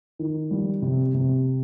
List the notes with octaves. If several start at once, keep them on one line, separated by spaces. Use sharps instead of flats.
D#3
G3
C3
C3